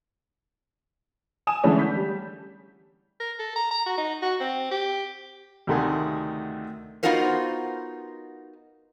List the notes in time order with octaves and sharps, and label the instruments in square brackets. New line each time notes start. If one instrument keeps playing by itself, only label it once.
[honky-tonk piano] G#5 D#6 E7
D3 E3 G#3 A3 C#4 D4
G6 B6
G3
[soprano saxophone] A#4
A4
A#5
A#5
F#4
D#4
F#4
C4
G4
[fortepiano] D2 C3 D#3 A3 F#5 G#5
[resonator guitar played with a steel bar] B3 D#4 F4 F#4 A#4 C5